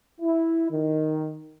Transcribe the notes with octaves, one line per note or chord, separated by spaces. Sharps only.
E4
D#3